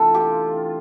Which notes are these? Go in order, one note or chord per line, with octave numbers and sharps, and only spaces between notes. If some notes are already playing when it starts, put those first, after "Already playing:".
Already playing: C3 E3 A3 D4 F4 A4
G4